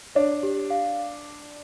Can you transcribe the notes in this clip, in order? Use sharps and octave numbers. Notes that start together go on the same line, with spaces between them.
D4 C#5
G4
F5